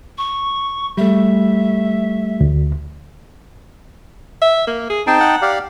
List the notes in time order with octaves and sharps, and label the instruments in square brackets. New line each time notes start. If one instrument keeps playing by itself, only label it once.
[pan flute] C#6
[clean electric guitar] G3 A3 [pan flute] E5
[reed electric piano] D2
[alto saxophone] E5
A#3
G#4
[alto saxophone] C4 [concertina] D#4 G5 A5
[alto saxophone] F#5
[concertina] G4 D5 F5